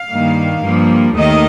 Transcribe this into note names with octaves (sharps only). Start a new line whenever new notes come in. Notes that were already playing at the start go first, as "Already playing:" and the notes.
Already playing: F5
G2 D#3 A#3
G2 F3 A#3
D#2 D#3 A3 D#5